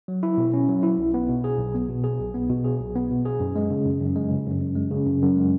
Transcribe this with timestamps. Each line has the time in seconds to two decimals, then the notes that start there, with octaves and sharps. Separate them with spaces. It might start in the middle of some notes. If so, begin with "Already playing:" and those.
0.08 F#3
0.23 E4
0.38 B2
0.53 C#4
0.69 F#3
0.83 E4
0.98 B1
1.14 B3
1.29 B2
1.44 G#4
1.59 B1
1.75 B3
1.89 B2
2.04 G#4
2.20 B1
2.34 B3
2.49 B2
2.64 G#4
2.79 B1
2.95 B3
3.10 B2
3.25 G#4
3.40 F#2
3.56 G#3
3.70 C#3
3.85 F#2
4.00 F#2
4.16 G#3
4.31 C#3
4.47 F#2
4.61 F#2
4.76 G#3
4.91 C#3
5.06 F#2
5.22 F#2
5.36 G#3